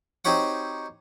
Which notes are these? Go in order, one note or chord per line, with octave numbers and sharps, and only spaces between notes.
C4 D#4 F#4 G4 C#5 F#5